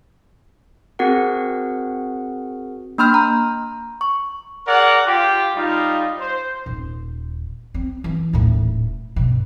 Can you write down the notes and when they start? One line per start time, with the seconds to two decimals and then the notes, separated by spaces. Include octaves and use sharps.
0.99 C4 F#4 G#4 A#4 F#5
2.98 A#3 D4 B5 C6 F6 G6
3.14 A#5
4.01 C#6
4.67 G#4 A#4 D5 F#5
5.06 F4 G4
5.54 G3 D#4 F4
6.19 C5
6.66 D#1
7.74 C4
8.04 E3
8.33 D#1 A2
9.16 G2 B2